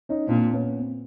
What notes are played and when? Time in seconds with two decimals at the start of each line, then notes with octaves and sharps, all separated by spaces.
0.09 C#4 D#4
0.27 A#2 C4 D4
0.53 B3 C#4
0.80 C4